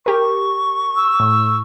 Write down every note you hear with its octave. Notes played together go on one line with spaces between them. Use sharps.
G4 A#4 C#6
E6
A2